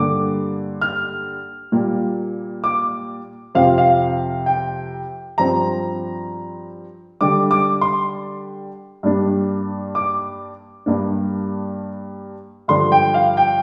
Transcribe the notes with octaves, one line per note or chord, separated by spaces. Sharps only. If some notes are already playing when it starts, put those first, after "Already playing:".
Already playing: G2 D3 G3 A#3 D6
F6
A#2 G3 A#3
D6
F2 C3 F3 C4 F5
F5
G5
G2 F3 C4 A#5
D3 G3 D4 D6
D6
C6
G2 G3 A#3 D4
D6
G2 G3 A#3 D4
G2 D3 F3 C6
G5
F5
G5